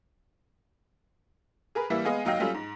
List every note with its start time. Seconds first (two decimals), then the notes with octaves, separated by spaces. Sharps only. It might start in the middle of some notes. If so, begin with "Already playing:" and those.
1.75 G#4 A#4 B4
1.90 E3 G3 A#3 E4
2.05 G#3 B3 D#5 F5 G#5
2.25 F1 F#3 D#4 F5 G5 A#6
2.40 F#3 G3 A3 C#4 F4
2.54 G#2